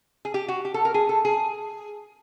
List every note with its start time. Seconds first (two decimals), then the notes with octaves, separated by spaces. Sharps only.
0.25 G#4
0.34 G4
0.48 F#4
0.65 G4
0.74 A4
0.85 A#4
0.94 G#4
1.09 A4
1.25 G#4